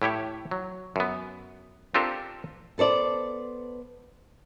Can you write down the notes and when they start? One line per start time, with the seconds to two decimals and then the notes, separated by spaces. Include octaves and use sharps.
0.02 A2 E4 G4 C#5
0.51 F#3
0.96 F#2 B3
1.94 C4 D4 F4 G4 A4 A#4
2.78 B3 A4 C5 D5